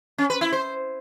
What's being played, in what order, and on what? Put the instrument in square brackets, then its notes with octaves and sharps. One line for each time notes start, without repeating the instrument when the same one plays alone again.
[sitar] C#4
B4
E4
C5